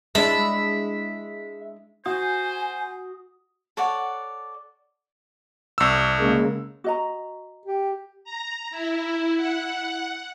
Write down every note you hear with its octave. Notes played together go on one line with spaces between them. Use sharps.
G#3 D4 E4 E5
F#4 C5 G#5 D#6
A4 C#5 D5 F#5
C2 E6
C#3 G#3 A#3
F#4 D#5 A#5
G4
A#5
E4
F#5